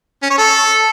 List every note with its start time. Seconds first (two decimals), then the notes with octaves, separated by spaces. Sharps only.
0.23 C#4
0.31 C#5
0.38 A4